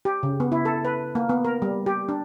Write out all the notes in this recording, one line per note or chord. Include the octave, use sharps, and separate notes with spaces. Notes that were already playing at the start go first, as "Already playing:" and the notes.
G4
C#3
B3
E4
A4
B4
A#3
B3
A#4
G3
G4
D4